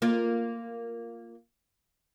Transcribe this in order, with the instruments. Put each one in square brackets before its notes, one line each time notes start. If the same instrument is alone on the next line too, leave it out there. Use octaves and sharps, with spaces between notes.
[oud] A#3 F4